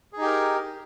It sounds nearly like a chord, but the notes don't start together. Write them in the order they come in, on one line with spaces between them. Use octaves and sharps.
G#4 D#4 G4 A#4